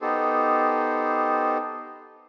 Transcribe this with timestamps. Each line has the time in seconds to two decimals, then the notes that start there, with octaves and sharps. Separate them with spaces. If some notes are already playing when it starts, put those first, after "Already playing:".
0.01 B3 D#4 G4 A4 C5